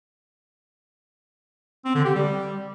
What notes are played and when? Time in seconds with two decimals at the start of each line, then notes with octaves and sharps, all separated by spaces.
1.85 C4
1.95 D3
2.05 G4
2.15 G3